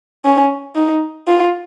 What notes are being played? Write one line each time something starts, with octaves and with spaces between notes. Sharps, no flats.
C#4
D#4
F4